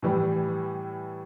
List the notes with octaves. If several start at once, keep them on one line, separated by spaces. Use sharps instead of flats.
A2 E3 G3